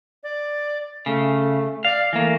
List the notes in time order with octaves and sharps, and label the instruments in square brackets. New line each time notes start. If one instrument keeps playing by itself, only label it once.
[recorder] D5
[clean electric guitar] C#3 [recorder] A3
[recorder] D5 [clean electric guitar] F5
[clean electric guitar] E3 A#3 [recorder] A3